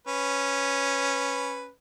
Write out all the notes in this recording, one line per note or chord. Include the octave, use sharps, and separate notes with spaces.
C#4 B4